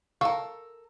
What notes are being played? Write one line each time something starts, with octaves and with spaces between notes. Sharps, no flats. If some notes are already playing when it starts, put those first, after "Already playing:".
A4 A#4 F5 C#6